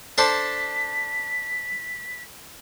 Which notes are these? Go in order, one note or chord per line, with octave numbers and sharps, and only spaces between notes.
D4 A4 C5 B6